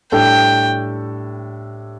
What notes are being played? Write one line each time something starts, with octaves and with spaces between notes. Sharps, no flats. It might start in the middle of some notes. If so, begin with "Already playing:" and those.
A2 G3 D4 A4 G5